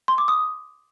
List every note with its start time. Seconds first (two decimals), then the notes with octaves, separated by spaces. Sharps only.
0.08 C6
0.18 D6
0.28 D#6